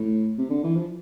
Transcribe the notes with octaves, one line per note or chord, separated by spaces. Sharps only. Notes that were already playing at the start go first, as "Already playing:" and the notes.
Already playing: A2
C3
D3
E3
F3